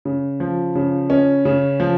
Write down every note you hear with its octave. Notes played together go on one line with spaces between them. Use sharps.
C#3
F3
C#3
C#4
C#3
F3